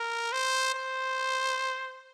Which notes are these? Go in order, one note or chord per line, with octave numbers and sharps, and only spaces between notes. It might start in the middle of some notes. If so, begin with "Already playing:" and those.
Already playing: A#4
C5
C5